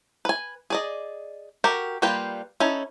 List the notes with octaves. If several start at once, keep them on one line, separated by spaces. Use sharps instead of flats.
B4 G#5
G#4 D5 D#5
F#4 G4 A4 A#4
G3 A#3 F4 B4 G5
C#4 D#4 E4 A4